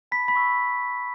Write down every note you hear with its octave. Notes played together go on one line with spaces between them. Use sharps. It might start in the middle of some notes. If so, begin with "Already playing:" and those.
A5 B5 B6
B5 B6
C#6 E6